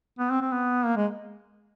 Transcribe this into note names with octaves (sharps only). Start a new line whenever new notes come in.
B3
C4
C4
B3
A#3
G#3